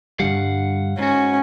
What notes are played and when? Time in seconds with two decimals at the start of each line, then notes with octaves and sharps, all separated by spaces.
0.20 G2 D3 G3 F5 F#5
0.98 G#2 C#4 F#4